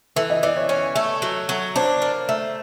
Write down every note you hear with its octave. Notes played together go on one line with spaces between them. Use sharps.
E3 A4
D#5
E3 D5
C#5
C#4 C#5
A3
F#3
F#3
D4 C5
A#3
A3